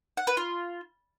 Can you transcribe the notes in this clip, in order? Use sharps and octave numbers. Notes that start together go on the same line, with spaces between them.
F#5
B4
F4